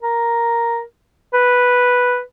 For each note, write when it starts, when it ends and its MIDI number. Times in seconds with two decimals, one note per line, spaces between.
0.02 0.82 70
1.33 2.21 71